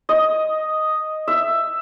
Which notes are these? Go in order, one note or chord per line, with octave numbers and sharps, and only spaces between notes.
D#5
E5